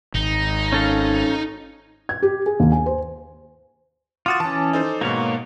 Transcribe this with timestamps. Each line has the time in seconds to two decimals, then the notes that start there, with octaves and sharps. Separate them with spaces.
0.15 G#1 D#4
0.73 C#4 A4 F5
2.09 G#6
2.22 G4
2.46 G#4
2.60 D#2
2.72 G#5
2.86 C5
4.26 F4 F#4 D6 D#6 A6
4.40 E3 C#4 A5
4.73 D#4 A4 C5
5.01 G#2 B2 A#3 C#5